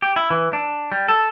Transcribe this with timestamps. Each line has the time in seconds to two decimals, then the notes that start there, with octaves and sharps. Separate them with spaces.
0.02 G4
0.16 E4
0.30 E3
0.53 D4
0.92 G3
1.08 A4